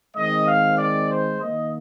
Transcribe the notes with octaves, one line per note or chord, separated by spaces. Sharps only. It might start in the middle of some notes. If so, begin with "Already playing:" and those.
D#3 G#3 C4 D#5
F5
D5
C5
D#3 A#3 D#5